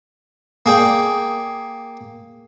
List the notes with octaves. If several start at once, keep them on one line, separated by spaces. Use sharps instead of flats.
A#3 G#4 D5 G5